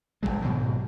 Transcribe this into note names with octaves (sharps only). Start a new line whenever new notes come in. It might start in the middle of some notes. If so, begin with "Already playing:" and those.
E1 E2 F#3 G#3
G#2 B2 D#3 F#3